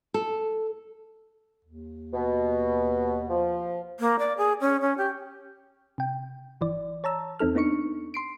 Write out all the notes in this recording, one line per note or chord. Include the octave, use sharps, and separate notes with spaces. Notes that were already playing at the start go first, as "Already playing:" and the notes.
A4
D#2
B2
F3
A#3
D5
G#4
C#4
C#4
G4
C3 G5
G1 E3 D5
C#5 A5 A#5 E6
E2 C4 D#4 A4 F6
B3 D4 D#4 C#6 C#7
C6 C7 D7